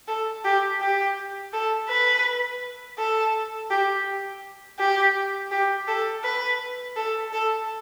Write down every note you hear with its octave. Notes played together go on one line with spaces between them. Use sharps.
A4
G4
G4
A4
B4
A4
G4
G4
G4
A4
B4
A4
A4